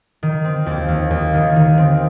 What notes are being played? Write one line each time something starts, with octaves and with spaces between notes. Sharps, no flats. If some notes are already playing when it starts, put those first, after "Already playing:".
D#3
C4
D#2
D#2
D#2
D#3
D#3
C4